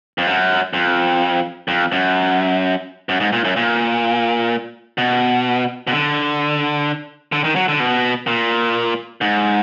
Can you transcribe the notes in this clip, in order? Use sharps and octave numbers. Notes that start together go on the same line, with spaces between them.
F2
F#2
F2
F2
F#2
F#2
G#2
A#2
F#2
A#2
B2
B2
D3
D3
D#3
F#3
D3
B2
A#2
G#2